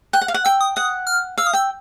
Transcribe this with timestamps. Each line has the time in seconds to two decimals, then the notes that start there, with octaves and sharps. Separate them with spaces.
0.13 G5 F#6
0.21 F#5
0.28 F5
0.34 F#5
0.45 G5 E6
0.61 D#6
0.76 F#5 D#6
1.07 F6
1.38 F5 E6
1.47 D#6
1.53 G5 E6